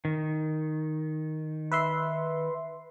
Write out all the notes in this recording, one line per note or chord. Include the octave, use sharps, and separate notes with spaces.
D#3
B4 E5 C6